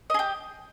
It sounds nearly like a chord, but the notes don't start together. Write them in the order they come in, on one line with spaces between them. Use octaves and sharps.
D#5 G#4 G4